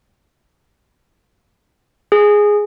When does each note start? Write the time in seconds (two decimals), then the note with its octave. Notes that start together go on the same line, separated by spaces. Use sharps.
2.12 G#4